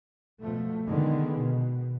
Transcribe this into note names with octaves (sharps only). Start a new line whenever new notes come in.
B2 F3 A3
D3 D#3 G#3 B3
B2